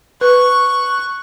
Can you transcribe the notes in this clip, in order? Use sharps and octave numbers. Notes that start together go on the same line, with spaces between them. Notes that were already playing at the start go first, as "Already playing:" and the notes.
B4 C#6 F#6